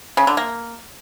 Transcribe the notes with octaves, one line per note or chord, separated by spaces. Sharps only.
C#3
D3
A#3